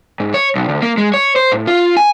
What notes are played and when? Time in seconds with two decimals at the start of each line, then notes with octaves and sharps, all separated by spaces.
0.20 G#2
0.34 C#5
0.55 B1
0.69 D2
0.82 A#3
0.98 G#3
1.14 C#5
1.36 C5
1.52 A2
1.67 F4
1.97 G#5